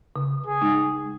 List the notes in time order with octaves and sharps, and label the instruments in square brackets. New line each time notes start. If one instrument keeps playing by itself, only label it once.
[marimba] C#3
[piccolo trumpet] G#4
[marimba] G#3 D#4